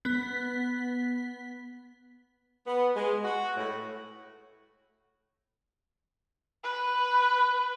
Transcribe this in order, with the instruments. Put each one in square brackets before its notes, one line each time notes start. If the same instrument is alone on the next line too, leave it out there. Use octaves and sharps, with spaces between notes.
[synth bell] B3 B6
[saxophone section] B3
G#3
F#4
A2
[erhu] B4